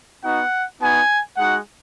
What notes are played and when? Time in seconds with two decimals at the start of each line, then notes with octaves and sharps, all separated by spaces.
0.24 B3 D#4 F#4 F#5
0.81 B3 D#4 F#4 G#5
1.37 G#3 D#4 F#4 F#5